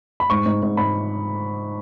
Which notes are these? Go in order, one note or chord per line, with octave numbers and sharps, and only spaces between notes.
B5
G#2 C#6
G#2
G#2
G#2 B5